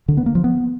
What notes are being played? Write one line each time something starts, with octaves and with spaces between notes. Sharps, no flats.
D3
B3
A#3
F3
B3